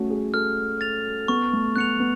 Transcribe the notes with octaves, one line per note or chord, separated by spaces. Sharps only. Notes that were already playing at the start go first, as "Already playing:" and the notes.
Already playing: A3 C#4 F#4
G#4
A4 F6
A6 F7
B3 C#6
A3
B3 F#6 C#7 F7
B3